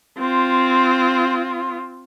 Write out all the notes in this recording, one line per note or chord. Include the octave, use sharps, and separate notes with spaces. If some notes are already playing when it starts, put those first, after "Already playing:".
C4 F4